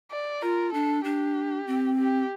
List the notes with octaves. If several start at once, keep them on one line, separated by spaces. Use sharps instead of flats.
D5
F4 A#4
D4 A4
D4 G4
C4
G4